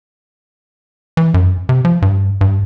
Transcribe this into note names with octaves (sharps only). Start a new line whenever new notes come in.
E3
F#2
C3
F3
G2
G2